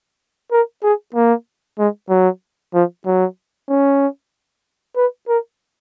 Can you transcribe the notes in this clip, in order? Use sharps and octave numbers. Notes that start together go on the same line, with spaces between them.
A#4
G#4
A#3
G#3
F#3
F3
F#3
C#4
B4
A#4